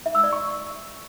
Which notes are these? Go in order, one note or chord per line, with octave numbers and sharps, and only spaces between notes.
E5
E6
D5
C#6